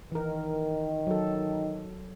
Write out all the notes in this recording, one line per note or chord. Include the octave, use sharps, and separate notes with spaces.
D#3 E3 A#4
F#3 A4